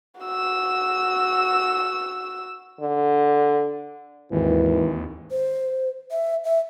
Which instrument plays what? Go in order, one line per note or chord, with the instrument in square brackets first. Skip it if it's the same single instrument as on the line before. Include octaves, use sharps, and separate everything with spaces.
[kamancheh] F#4 E6
[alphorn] D3
[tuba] G#1 [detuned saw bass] D#2 [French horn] E3
[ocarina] C5
E5
E5